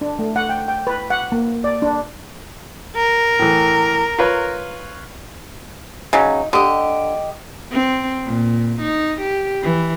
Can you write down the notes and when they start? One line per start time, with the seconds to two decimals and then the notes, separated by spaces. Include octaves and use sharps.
0.01 D4
0.19 A3
0.36 F#5
0.49 G5
0.68 G5
0.87 B4
1.10 F#5
1.32 A#3
1.64 D5
1.82 D4
2.96 A#4
3.39 A2 E3
4.19 F4 B4 C#5
6.13 C#3 F#3 D#4
6.53 D3 G4 D#5
7.72 C4
8.26 A#2
8.81 D#4
9.21 G4
9.63 E3